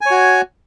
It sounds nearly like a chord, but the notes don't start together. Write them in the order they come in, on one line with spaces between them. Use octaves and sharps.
G#5 C#5 F#4